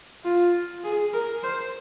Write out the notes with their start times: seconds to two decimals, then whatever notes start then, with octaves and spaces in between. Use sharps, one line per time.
0.25 F4
0.84 G#4
1.14 A#4
1.43 C5